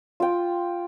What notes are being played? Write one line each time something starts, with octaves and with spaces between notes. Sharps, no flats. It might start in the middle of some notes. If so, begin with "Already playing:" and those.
F4 G5